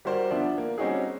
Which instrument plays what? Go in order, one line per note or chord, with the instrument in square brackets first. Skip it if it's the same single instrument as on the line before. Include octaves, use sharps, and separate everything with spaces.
[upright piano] G3 F#4 A#4 C5 D5
F3 B3 D4 E5
A#3
G3 C4 C#4 D#4 F#4 G#4